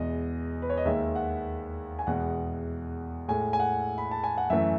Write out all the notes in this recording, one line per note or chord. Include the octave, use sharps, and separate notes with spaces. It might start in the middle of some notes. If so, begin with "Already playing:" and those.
Already playing: E2 B2 G#3 D#5
B4
C#5
D#5
D#2 D#3 G#3 E5
F#5
G#5
E2 B2 G#3 F#5
A2 G#3 G#5
G#5
F#5
B5
A5
G#5
F#5
F#2 E3 A3 E5